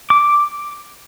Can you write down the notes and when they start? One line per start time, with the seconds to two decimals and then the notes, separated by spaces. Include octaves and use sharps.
0.10 D6